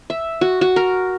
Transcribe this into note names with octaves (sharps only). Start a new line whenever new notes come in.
E5
F#4
F#4
A#4